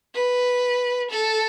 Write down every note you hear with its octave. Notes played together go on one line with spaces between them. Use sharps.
B4
A4